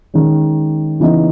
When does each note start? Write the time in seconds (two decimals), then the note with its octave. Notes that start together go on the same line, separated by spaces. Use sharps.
0.14 D#3 G#3 C#4
1.00 C#3 E3 B3 D#4